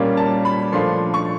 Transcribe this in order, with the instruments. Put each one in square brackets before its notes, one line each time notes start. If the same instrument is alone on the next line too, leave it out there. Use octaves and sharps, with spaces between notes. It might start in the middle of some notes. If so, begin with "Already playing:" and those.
Already playing: [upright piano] A#2 G3 A#3 C#4 F4
A5
B5
A#2 F3 A3 D4 F4 C6
C#6